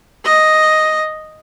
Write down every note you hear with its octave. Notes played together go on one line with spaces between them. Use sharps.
D#5